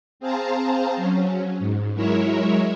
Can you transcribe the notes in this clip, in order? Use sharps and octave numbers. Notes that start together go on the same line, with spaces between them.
C4 G#4 C5 F5 A5 A#5
F#3 C#4
G#2
F#3 G#3 E4 A#4 C#5 E5